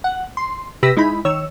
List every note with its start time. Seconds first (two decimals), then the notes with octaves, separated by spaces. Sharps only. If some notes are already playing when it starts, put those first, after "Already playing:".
0.04 F#5
0.37 C6
0.83 C3 G4 B4 E6 A#6 B6
0.97 G#3 D#4 E4 B5
1.25 D#3 C#5 E6